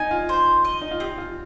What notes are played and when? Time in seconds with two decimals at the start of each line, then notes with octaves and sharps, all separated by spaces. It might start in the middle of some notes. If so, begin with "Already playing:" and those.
Already playing: D#4 G#5
0.11 F4
0.29 C5
0.65 D#5
0.81 D#4
0.91 F4
1.00 C4 G4
1.18 F4